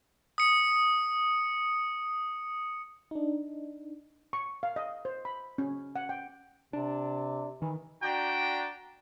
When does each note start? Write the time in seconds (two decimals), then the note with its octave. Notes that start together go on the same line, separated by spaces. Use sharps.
0.38 D#6 C#7
3.11 D4 D#4
4.33 C#6
4.63 F5
4.76 D#5
5.05 C5
5.25 B5
5.58 C#4
5.96 F#5
6.09 G5
6.73 C3 D4
7.62 D#3 E3
8.02 D4 F#4 D5 G5 A#5